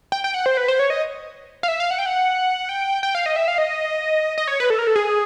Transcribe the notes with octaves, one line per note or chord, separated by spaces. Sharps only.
G5
G5
F#5
C5
B4
C5
C#5
D#5
F5
E5
F5
F#5
G5
F#5
G5
G5
F5
D#5
E5
F5
D#5
D#5
C#5
B4
A4
A#4
A4
G#4